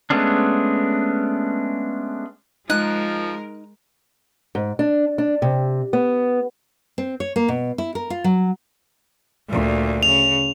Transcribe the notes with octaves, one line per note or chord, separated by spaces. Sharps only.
G#3 A3 B3 C#4 D4
F3 G#3 D#4 A#4 F#6
G#2
D4
D4
C3
B3
C4
C#5
A#3
B2
E4
A#4
F4
F#3
D2 A#2
C#3 F7